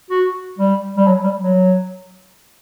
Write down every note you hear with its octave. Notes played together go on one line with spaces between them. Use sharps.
F#4
G3
G3
F#3
G3
F#3